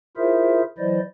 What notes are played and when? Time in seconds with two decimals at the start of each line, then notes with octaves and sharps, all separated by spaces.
0.17 E4 F4 G#4 A#4 C5 E5
0.78 E3 F#3 E4 C5 D5 D#5